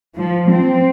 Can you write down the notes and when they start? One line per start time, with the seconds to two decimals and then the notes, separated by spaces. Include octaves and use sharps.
0.17 F3
0.51 C4